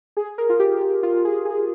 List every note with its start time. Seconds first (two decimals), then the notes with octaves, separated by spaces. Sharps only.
0.17 G#4
0.38 A#4
0.49 F4
0.60 G4
0.81 G4
1.03 F4
1.25 G#4
1.45 G#4